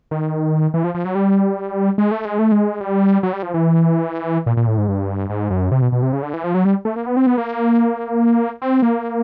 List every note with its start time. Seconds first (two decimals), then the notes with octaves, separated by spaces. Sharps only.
0.11 D#3
0.74 E3
0.84 F3
0.94 F3
1.05 F#3
1.15 G3
1.98 G#3
2.11 A3
2.25 G#3
2.39 A3
2.52 G#3
2.81 G3
3.23 F#3
3.33 G3
3.43 F3
3.54 E3
4.46 A#2
4.57 A#2
4.68 A2
4.78 G#2
4.88 G2
5.30 G#2
5.51 F#2
5.72 C3
5.82 B2
5.92 B2
6.02 C3
6.13 C#3
6.23 D3
6.33 E3
6.44 F3
6.54 F#3
6.65 G3
6.85 A3
6.96 A#3
7.06 B3
7.17 C4
7.27 B3
7.38 A#3
8.62 C4
8.82 A#3